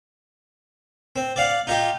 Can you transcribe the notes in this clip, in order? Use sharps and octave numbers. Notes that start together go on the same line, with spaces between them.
C4
D5 F5 F#5
D#4 F4 G4